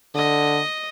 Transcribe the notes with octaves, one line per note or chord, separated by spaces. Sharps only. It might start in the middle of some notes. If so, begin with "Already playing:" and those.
D3 D#5